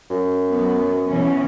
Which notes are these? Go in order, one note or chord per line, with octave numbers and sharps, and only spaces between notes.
F#2
F#3 B3
B2 E3 C#4